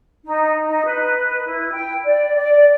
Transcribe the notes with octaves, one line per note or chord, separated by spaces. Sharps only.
D#4
D#4
B4
E4
G5
D5
D5